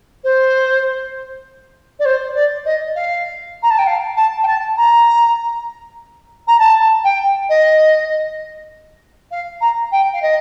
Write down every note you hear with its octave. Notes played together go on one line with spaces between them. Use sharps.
C5
D5
C5
D5
D#5
F5
A#5
A5
G5
F5
A5
G5
A5
A#5
A#5
A5
G5
D#5
F5
A#5
G5
F5
D#5